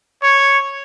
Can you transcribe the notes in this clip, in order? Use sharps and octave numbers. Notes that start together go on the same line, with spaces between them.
C#5